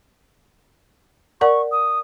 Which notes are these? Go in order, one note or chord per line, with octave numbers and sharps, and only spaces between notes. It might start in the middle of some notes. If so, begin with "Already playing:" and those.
A#4 D5 F#5 C#6
D#6